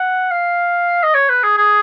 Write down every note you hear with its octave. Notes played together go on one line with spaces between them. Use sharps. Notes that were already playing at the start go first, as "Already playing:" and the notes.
Already playing: F#5
F5
D#5
C#5
B4
G#4
G#4